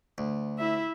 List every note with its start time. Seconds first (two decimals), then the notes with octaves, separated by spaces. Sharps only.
0.18 D2
0.59 E4 E5